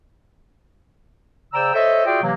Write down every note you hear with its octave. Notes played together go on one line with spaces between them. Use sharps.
C#3 C5 D5 G5 A#5 E6
A4 C5 C#5 D#5 E5
F4 F#4 G#4 D5 E5 G5
C3 E3 F#3 A#3